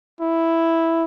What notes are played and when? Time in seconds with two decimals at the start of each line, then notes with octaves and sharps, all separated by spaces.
0.21 E4